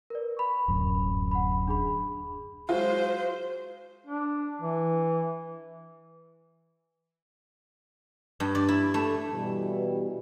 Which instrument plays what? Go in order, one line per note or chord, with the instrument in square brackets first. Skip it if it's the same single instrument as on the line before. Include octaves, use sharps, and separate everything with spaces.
[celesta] A#4 B4 D5
B5 C#6
[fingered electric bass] D1 F#2
[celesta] F#5 B5
D4 G#4 B5
[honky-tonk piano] F#3 G#3 F4 [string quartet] C5
[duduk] D4
E3
[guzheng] G2
D5
E4
A3
[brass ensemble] B2 E3 G3